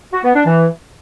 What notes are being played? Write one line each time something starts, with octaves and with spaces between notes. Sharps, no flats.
F#4
B3
D4
E3